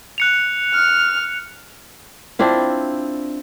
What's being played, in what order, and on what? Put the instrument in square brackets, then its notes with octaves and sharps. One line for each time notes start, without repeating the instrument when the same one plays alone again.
[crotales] F#6 C#7 F7
[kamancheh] F6
[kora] C4 D4 E4 F4